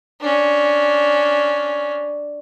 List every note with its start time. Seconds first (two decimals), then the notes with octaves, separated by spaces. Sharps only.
0.20 C#4 D4